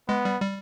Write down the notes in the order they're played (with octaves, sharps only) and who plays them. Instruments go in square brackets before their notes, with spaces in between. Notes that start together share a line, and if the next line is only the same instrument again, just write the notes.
[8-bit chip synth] G#3 [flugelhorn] B3
[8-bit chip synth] G3
G3